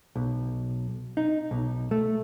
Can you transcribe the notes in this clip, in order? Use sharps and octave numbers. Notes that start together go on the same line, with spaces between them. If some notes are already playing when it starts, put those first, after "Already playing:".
B1
D#4
B1
A3